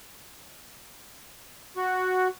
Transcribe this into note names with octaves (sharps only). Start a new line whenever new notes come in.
F#4